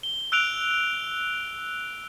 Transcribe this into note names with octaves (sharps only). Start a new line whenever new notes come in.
G7
E6 F#6 D7 F7